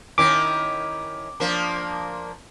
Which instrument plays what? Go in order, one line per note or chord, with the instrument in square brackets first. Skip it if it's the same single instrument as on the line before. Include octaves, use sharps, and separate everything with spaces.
[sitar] D#3 C#4 E4 [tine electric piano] D6
[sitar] F3 A#3 D4